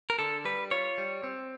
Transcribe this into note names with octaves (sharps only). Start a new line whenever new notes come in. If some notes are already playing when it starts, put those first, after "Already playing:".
A#4
D3 A4
G3 B4
F4 C#5
G3
C4